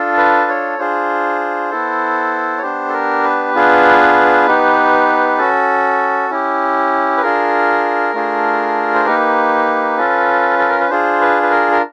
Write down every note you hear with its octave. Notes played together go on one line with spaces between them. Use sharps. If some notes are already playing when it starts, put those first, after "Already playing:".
Already playing: D4 F4 A4
B4
C#5
D4 F4 G#4 C5
B3 E4 A4
C#5
B3 D4 G4 C5
A4
A#4
B4
B3 D4 F4 G#4
B3 D#4 G4
C#4 F#4 A4
C#4 E4 G4
B4
D4 F4 G#4 A#4
A3 D4 F4 G#4
C5
A#3 D#4 G4 B4
C#4 F4 A4
A4
A#4
B4
D4 F4 G#4 C5
B4
B4
A#4
A#4